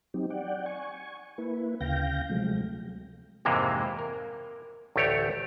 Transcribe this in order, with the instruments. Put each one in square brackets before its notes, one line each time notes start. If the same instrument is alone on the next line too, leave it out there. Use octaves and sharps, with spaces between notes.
[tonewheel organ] F#3 C4 D#4 G4
D5 F#5 G5
G#5 C#6
A#3 E4 B4
D2 C#3 F5 G5 G6 A#6
C3 F3 F#3 G#3 A3
[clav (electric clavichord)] F2 G#2 C3 E3 G#3 A#3
A#4
A1 D2 A3 G4 C#5